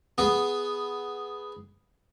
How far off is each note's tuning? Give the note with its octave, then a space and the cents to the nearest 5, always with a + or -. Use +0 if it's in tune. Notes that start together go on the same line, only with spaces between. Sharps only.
B3 +0 G#4 +0